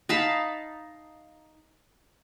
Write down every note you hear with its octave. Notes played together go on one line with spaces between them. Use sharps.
D#4 F5 A5 B5